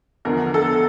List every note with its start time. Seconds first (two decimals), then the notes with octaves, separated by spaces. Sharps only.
0.25 E2 D3 F3 A#4
0.54 A4